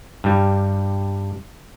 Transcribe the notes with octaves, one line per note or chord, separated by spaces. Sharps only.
G2 G3